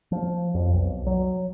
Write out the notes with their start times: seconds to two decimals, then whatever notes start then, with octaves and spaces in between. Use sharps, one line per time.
0.12 F3
0.55 F2
0.73 B1
1.07 F#3